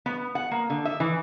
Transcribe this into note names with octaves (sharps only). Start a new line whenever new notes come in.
B3
F#5
A#3
D3
E5
E3